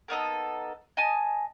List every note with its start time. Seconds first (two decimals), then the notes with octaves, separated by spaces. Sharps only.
0.08 A#3 B3 D#4 A4
0.97 D#5 G#5 A5